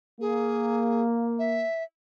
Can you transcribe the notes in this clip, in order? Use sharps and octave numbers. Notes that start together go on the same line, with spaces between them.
A#3 G#4
E5